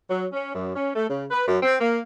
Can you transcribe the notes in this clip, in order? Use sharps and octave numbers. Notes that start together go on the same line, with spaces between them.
F#3
C#4
F#2
C#4
A3
C#3
B4
F#2
C4
A#3